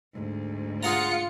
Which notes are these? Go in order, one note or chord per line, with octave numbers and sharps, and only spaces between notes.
D2 G#2
F4 G#4 F#5 A#5 C#7